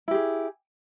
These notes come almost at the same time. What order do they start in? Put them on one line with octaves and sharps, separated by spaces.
E4 G4 G#4